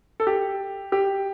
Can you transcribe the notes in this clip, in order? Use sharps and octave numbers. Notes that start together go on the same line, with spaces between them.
A4
G4
G4